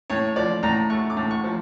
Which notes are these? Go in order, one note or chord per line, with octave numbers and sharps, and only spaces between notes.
A2 C#5
F3 D5
A2 A#5
A3 C#6
D6
A2
C#6
F3